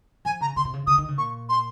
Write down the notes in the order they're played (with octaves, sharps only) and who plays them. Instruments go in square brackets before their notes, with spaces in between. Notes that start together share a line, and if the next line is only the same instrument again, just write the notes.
[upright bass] F3 [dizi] G#5
[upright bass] C#3 [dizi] A#5
[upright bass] C#3 [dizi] C6
[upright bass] C3
C#3
[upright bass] C#3 [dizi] D#6
[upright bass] D#3
C#3
[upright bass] A#2 [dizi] C#6
[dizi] C6